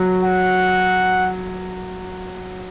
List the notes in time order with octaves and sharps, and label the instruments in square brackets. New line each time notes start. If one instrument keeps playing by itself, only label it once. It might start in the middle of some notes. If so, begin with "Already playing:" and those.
Already playing: [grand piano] F#3
[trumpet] F#5